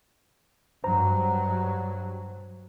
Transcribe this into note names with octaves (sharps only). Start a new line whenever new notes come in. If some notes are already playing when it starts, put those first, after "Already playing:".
G2 F#3 C5 A#5